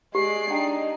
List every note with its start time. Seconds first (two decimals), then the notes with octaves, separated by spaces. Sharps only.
0.15 G#3 G4 D5 C7
0.51 D4 D#4 G5